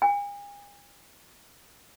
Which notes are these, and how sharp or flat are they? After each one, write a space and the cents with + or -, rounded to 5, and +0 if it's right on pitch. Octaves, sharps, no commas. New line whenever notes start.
G#5 -40